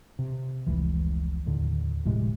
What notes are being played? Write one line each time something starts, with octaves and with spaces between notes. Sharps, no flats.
C3
F1 C#2 E3
D#2 A2 D3
F1 A2 C3 G#3